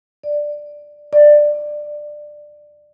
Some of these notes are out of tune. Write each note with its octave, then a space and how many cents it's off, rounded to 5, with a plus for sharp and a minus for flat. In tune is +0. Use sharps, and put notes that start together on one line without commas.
D5 +5
D5 +15